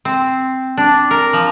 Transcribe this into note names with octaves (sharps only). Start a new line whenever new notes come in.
C4
D4
A#4
F3